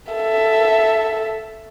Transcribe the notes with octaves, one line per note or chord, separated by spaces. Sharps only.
A4 E5